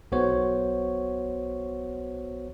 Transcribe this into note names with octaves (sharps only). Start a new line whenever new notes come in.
B1 B3 F#4 C5 C#5